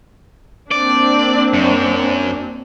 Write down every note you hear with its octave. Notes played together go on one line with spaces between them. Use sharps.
A#3 C4 D4 D5
F#2